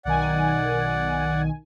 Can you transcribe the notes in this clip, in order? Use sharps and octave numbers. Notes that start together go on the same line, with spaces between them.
B1 D#3 D5 F#5 G#5